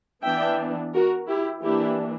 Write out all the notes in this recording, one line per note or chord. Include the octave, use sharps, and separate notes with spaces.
E3 B3 D4 E5 G5
F#4 A#4
E4 G4
E3 A#3 D4 E4 G4